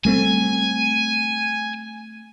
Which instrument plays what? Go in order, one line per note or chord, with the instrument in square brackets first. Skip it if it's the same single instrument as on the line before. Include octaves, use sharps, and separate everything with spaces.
[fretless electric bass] G3 A3 C4 [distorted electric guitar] G#5